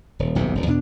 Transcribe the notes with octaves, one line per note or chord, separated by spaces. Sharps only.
D#1
D#1 B1 F2 C3
E1 F#2
E2 B2 C#4 D4